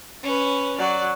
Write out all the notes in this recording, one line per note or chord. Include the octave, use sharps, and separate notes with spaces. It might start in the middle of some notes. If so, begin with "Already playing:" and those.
C#4 B4
F#3 D5